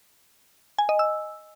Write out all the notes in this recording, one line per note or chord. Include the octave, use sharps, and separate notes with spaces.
G#5
D#5
E6